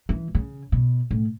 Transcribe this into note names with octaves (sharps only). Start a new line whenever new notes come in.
E3
C#3
B2
A2